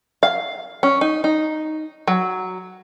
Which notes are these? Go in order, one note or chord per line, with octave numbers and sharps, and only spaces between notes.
F5
C#4
D#4
D#4
F#3